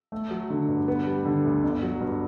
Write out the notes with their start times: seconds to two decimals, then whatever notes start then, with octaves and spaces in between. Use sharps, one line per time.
0.12 A3
0.31 F#3
0.50 D3
0.68 G2
0.88 B3
1.07 G3
1.25 D3
1.44 D2
1.63 G1
1.82 F#3
2.00 G2